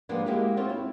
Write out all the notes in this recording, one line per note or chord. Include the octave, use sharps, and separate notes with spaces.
F3 G3 G#3 A#3 B3 D4
G#3 A#3 E4 F#4 G4
C4 C#4 F4 F#4
E4